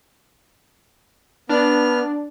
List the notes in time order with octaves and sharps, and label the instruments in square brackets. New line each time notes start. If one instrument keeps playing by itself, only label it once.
[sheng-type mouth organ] B3 F6 [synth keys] D4